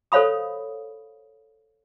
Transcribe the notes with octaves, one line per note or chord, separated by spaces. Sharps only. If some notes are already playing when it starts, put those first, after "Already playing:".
A4 C5 C#5 F5 B5 D#6